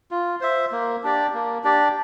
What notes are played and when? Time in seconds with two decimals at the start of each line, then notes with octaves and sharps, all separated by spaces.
0.11 F4
0.41 C5 E5
0.72 A#3
1.03 D4 G4 D5
1.34 A#3
1.64 D4 G4 D5